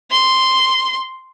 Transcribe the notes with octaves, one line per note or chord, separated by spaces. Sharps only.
C6